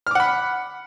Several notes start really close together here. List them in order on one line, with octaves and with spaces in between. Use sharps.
F6 D6 F#5 B5